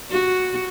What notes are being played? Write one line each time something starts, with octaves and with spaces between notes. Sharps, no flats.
F#4